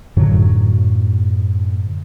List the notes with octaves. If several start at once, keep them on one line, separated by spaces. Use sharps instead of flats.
F#2 A2 D3 F#3